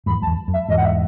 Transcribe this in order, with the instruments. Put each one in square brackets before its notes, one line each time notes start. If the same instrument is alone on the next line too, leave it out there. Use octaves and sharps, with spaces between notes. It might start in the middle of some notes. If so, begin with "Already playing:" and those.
[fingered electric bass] E2 G#2 [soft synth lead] B5
[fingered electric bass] F#2 [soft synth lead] A5
[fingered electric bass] E2
F#2
[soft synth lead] E5
[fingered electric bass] E2 G#2 [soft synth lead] D#5
[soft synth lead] F#5
E5